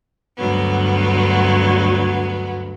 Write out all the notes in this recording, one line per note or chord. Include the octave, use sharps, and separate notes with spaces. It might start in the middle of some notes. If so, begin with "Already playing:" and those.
D2 G2 F#3 B3